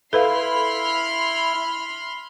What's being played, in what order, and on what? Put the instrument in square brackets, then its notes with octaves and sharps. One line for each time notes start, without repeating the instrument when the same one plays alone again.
[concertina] E4 [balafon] A4 B4 F5 [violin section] B5 C6 F6